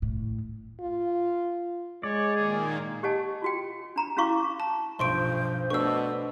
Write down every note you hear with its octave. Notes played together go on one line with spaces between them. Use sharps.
A2
F4
G#3 C#5 D5
A#2 D#3 A#3 G#4
G4 C#5 D#5 F#5 G#5 A5
F4 F#4 G5
D4 A#5 B5
C#4 E4 F#4 F5 C#6 D6
A5
B1 G2 F3 C5 C6 C#6 D7
B2 A3 D4 C5 C#6 E6